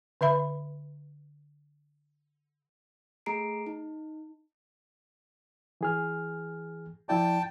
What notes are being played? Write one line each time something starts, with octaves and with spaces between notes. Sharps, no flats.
D3 B4 E5 B5
A3 G#4 A#5 C7 D7
D#4
E3 G#4 F6
F3 E4 D5 G5 A5